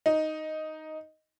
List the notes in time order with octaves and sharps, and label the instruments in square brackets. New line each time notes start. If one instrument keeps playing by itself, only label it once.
[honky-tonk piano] D#4